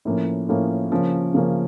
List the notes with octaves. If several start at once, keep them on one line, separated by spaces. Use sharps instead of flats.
A2 F3 A#3 C#4
A2 F3 A#3 C#4
C#3 F3 A#3 C#4
C#3 F3 A#3 C#4